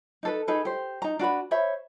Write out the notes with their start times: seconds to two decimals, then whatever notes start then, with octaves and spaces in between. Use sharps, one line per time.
0.23 D#4 A4 B4
0.48 D#4 G#4 A4 B4
0.65 G4 C5
1.02 D#4 A#5
1.19 D4 F#4 B4 B5
1.51 C5 C#5 E5 B5